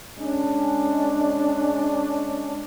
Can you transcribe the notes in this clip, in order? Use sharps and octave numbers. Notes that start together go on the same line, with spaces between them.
G#3 C#4 D4